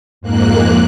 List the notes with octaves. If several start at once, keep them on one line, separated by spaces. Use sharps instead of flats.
F2 G#2 A#3 F#6